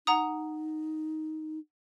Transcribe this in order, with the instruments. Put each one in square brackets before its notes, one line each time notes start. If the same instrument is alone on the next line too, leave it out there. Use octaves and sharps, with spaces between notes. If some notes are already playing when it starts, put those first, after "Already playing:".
[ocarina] D#4 [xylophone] F#5 A#5 D#6